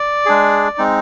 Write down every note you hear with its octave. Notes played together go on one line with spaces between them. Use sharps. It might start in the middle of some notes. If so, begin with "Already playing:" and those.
Already playing: D5
G#3 D4 G#4
G#3 C4 D#4